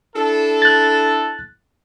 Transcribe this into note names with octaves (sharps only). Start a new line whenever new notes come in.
D4 E4 A4
F#6 A6